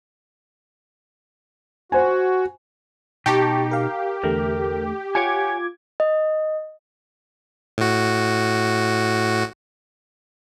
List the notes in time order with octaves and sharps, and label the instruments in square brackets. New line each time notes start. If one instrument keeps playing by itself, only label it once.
[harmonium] F#4 [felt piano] C5 G#5
[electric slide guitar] B2 D#4 [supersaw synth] G4 [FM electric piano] G5 A5 C#6
[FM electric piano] A#4 F5
[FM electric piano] E2 D3 A3 [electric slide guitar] A#4
[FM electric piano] F4 D6 G#6 [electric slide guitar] C#5 F#5 G#5
[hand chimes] D#5
[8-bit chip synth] A2 F#4